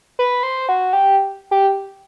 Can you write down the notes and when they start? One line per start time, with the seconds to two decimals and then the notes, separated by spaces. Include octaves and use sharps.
0.19 B4
0.43 C5
0.69 F#4
0.93 G4
1.51 G4